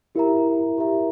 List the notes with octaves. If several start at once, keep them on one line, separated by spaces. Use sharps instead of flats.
E4 G4 A#4 E5 A#5
G4 A#4 E5 A#5